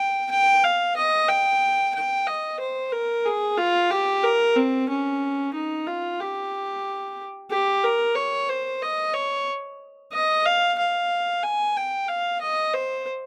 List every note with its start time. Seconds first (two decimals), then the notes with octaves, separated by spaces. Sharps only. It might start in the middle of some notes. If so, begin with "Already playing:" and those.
Already playing: G5
0.31 G5
0.63 F5
0.96 D#5
1.29 G5
1.94 G5
2.26 D#5
2.60 C5
2.92 A#4
3.25 G#4
3.57 F4
3.90 G4
4.23 A#4
4.56 C4
4.89 C#4
5.54 D#4
5.87 F4
6.20 G4
7.51 G4
7.83 A#4
8.15 C#5
8.49 C5
8.82 D#5
9.14 C#5
10.12 D#5
10.46 F5
10.78 F5
11.43 G#5
11.76 G5
12.08 F5
12.41 D#5
12.74 C5